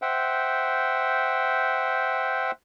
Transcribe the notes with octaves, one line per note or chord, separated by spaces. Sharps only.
C5 E5 F#5 G5